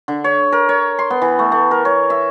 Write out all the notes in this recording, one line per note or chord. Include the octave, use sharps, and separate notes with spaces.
D3
C#5
A#4
C#5
C6
B3
E3
A3
A3
A#4
C#5
E5